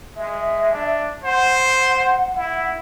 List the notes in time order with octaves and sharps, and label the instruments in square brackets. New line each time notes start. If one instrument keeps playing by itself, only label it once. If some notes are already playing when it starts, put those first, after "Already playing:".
[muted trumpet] G#3 [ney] E5
[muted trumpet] D4
[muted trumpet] C5 [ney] F#5
[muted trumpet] E4